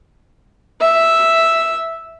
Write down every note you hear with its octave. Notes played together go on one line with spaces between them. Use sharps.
E5